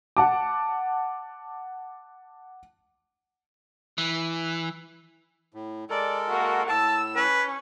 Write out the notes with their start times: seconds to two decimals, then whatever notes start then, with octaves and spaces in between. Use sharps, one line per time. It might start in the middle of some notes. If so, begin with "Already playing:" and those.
0.17 F#5 A5 D6
3.98 E3
5.54 A2
5.90 G#3 A4 A#4 D5
6.28 A#3 F#4
6.69 A2 A5 E6
7.16 C#4 B4